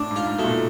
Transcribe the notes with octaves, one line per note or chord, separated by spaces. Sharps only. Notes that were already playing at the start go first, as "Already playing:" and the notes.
Already playing: A2 D4
G#2
F4
G#2
B2 A3
A#2